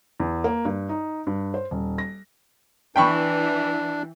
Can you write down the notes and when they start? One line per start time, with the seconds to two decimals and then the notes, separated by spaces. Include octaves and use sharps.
0.20 E2
0.44 A#3
0.65 G2
0.89 D#4
1.27 G2
1.54 C5
1.71 D#1
1.98 A#6
2.96 E3 D4 G5 B5 C#6